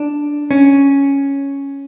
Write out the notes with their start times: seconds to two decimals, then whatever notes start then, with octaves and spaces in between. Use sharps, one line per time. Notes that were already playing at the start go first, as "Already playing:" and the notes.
Already playing: D4
0.51 C#4